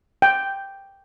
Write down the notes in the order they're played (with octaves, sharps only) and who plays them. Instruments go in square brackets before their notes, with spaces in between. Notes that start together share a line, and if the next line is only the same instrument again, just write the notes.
[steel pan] G5